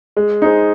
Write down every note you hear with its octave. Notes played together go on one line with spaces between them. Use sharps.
G#3
D#4 G#4 C5